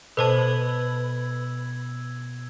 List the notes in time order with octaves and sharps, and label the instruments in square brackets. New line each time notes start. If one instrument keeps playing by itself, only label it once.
[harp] B2 D6 [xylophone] A4 C5 A5 [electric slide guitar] B4 [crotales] E6 G#6